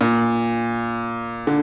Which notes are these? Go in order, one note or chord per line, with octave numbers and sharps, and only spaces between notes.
A#2
D3